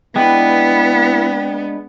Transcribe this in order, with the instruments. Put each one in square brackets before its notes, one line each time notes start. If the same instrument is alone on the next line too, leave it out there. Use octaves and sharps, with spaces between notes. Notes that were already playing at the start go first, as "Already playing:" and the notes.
[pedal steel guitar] G#3 D4 B4 [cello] B3 [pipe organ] E4 [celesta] G5